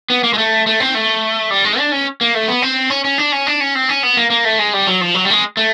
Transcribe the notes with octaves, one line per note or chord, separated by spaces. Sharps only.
B3
A#3
G#3
A3
A3
C4
A3
G3
G#3
D4
C#4
A#3
A3
B3
C4
C#4
C#4
D4
C#4
D4
C#4
C4
C#4
B3
A#3
A#3
A3
G#3
G3
F#3
F3
F#3
G3
A3
G#3
A3